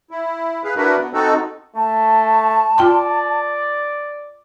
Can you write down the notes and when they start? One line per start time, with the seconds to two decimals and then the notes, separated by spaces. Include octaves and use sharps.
0.11 E4
0.64 G#4 B4 F5
0.77 D4 E4 F#4 A#4 B4
0.97 B3
1.13 C4 D#4 F#4 A4
1.76 A3 A5
2.78 F4 D5 G5 C6